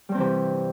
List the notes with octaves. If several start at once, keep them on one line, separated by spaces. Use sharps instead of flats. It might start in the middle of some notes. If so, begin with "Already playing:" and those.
G2 C3 E3 G3 C4